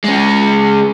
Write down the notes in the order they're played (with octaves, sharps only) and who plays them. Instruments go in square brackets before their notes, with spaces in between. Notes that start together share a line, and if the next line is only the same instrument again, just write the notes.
[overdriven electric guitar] G#3 C#4